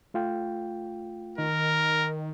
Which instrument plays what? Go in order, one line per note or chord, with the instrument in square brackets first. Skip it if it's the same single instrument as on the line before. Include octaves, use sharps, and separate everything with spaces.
[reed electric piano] A3 F4 G5
[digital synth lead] D#3 [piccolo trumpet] A#4